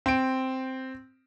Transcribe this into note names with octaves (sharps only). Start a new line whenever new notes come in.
C4 D7